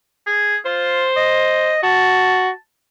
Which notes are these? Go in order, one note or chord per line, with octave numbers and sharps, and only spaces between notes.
G#4
F4 C5
D#5
F#4 A5